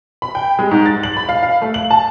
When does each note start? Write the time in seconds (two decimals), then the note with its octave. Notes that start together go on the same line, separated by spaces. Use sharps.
0.22 B5
0.35 G5
0.59 G#3
0.71 G#2
0.86 A6
1.03 F#7
1.17 B5
1.29 F5
1.43 F5
1.61 A3
1.74 F#7
1.91 A5